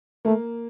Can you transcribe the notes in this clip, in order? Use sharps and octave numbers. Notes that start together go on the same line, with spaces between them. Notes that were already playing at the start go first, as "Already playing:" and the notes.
A3 A#3